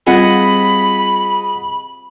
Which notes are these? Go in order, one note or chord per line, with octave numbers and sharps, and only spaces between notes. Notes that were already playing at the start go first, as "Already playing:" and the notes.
G3 C4 F4 G#4 D#5 F#5 B5